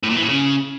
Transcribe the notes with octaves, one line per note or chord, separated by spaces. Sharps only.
A2
A#2
E3
A2
C#3